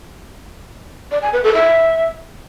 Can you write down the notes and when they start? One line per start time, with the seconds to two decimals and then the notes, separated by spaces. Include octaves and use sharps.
1.12 D5
1.22 G#5
1.33 B4
1.44 A4
1.54 E5